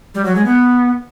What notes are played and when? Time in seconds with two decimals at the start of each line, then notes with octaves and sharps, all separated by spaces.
0.15 G3
0.25 F#3
0.35 G#3
0.46 B3